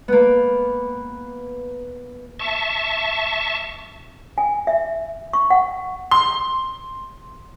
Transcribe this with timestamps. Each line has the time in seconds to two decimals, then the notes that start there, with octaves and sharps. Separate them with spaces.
0.08 A#3 B3
2.39 E5 A5 C#6
4.38 G#5
4.67 E5
5.33 C#6
5.50 F#5
6.11 C6